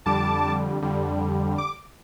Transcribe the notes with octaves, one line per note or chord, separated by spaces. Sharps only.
F2 D3 G3 A5 D6
F2 D3 G3
D6